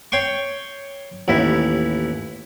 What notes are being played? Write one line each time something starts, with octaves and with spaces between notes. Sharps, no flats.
C#5 G5 C6 C#6
A1 D#2 E4